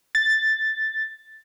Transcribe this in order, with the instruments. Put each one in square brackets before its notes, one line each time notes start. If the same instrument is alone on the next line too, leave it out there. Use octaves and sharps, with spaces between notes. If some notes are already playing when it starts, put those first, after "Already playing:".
[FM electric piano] A6